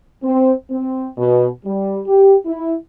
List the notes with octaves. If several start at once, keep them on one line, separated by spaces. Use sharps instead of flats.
C4
C4
B2
G3
G4
E4